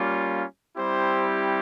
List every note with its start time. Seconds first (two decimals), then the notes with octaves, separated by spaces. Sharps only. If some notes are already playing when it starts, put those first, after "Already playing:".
Already playing: G3 A#3 C#4 F4
0.77 G3 C4 E4 G4 C5